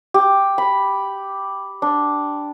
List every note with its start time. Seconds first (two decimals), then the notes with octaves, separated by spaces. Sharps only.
0.14 G4
0.58 B5
1.82 D4